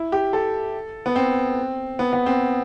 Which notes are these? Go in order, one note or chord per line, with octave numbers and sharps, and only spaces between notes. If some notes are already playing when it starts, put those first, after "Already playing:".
Already playing: E4
G4
A4
B3
C4
B3
B3
C4